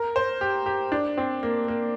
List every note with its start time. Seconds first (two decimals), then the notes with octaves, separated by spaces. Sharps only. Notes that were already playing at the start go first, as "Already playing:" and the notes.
Already playing: A#4
0.16 C5
0.41 G4
0.66 G4
0.92 D4
1.17 C4
1.43 A#3
1.68 A#3